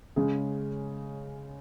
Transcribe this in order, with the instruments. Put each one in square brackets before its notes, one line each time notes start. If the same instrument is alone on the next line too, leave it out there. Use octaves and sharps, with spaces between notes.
[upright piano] C#3 G#3 C#4 G#4